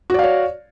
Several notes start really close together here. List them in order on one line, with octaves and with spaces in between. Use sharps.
F#4 D5 F5 C#5